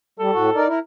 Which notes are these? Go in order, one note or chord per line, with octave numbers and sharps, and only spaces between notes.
G3 A4
A2 F#4
D#4 A#4 D5
E4 A#4